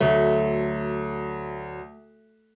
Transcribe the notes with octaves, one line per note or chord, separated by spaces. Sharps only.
D2 F#3 A3